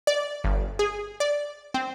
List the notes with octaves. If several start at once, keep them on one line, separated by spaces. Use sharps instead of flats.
D5
G1
G#4
D5
C4